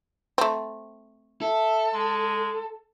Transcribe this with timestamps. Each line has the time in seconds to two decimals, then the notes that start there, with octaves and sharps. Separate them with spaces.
0.38 A3 C4
1.42 A4 E5
1.94 G#3